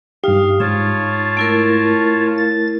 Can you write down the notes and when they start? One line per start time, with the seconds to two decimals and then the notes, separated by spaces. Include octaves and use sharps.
0.24 G2 D#4 G4 F5
0.60 G#2 F4 C#5 A5
1.37 A3 E4 A#4
2.38 A6